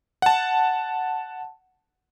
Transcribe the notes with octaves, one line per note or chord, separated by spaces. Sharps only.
F#5 A5